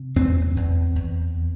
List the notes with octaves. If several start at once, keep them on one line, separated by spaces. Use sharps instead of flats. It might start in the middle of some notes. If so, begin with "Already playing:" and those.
Already playing: C3
E2 C4
E2
E2